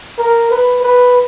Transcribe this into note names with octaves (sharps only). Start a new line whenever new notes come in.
A#4
B4
B4